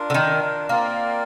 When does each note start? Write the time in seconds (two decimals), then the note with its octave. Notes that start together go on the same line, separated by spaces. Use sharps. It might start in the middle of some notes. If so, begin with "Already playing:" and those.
Already playing: D4 F4 A#4
0.10 D3
0.14 D#3
0.69 A#3 C4 F4 A#4 D5